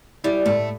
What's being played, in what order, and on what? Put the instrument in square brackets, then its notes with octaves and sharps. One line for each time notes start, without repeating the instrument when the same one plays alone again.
[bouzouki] G3 [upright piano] E4
[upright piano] A2 [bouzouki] A3